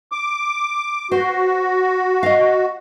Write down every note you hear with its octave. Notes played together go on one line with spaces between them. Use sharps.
D6
F#4 C5
D#5 F5